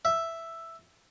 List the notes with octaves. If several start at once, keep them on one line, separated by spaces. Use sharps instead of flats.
E5